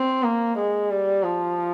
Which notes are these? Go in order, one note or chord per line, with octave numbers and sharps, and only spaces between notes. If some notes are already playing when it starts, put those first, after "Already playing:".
Already playing: C4
A#3
G#3
G3
F3